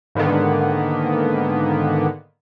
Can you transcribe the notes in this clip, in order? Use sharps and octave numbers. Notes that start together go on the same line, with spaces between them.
G#2 D3 D#3 A#3 B3